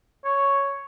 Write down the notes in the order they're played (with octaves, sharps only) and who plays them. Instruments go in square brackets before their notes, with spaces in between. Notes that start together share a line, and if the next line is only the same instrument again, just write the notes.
[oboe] C#5